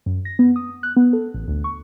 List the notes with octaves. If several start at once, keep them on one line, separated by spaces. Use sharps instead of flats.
F#2
A#6
B3
D#6
F#6
B3
A4
A1
D2
C#6